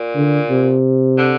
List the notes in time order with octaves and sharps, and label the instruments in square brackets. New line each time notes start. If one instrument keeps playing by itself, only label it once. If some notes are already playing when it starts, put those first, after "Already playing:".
Already playing: [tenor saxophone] A#2
[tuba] D3
C3
[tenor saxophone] D3